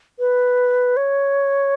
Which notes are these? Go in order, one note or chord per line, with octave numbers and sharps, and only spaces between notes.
B4
C#5